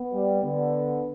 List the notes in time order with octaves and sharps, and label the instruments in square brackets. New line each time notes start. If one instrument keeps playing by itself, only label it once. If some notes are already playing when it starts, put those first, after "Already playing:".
Already playing: [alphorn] B3
[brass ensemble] G3
[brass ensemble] D3 [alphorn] B3